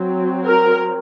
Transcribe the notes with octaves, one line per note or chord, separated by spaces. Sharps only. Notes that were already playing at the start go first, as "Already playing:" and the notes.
Already playing: F#3 C4
A#4